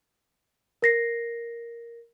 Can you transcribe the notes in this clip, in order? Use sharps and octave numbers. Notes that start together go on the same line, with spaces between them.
A#4 A#6 C7